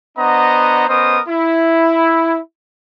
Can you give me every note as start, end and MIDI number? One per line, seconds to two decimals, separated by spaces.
0.18 0.88 59
0.18 0.88 62
0.18 0.88 72
0.18 0.88 75
0.18 0.88 78
0.18 0.88 82
0.88 1.19 59
0.88 1.19 61
0.88 1.19 70
0.88 1.19 72
0.88 1.19 75
0.88 1.19 87
1.29 2.38 64